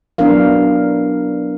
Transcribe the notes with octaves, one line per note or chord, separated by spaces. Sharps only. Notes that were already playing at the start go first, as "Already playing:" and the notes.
F#3 B3 D4 E4 A#4 F5